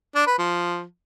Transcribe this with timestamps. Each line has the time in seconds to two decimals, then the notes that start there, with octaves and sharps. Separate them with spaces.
0.15 D4
0.27 B4
0.39 F3